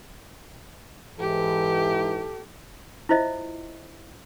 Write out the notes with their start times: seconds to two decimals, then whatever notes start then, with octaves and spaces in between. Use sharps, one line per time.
1.20 G#2 E3 G4 A4
3.09 E4 F4 C5 D#5 E5